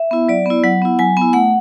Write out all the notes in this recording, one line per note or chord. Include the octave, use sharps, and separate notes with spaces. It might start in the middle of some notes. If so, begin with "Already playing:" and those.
Already playing: E5
B3 E4
F#3 D5
B3 E4
F#3 F#5
B3 E4
F#3 G#5
B3 E4 G#5
A3 F#5